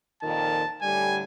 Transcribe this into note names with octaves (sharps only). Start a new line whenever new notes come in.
F2 A#2 D#3 A5
A2 D3 G3 G#5